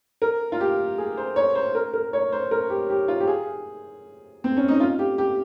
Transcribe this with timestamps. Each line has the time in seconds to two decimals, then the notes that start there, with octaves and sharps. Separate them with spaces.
0.22 A#4
0.52 F4
0.60 G4
0.98 G#4
1.18 C5
1.36 C#5
1.55 C5
1.75 A#4
1.94 A#4
2.13 C#5
2.32 C5
2.51 A#4
2.70 G4
2.90 G4
3.08 F4
3.20 G4
3.27 G#4
4.44 C4
4.57 C#4
4.68 D#4
4.80 F4
4.99 G4
5.18 G4